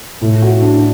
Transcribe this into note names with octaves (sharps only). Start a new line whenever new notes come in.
A2
F#4
D4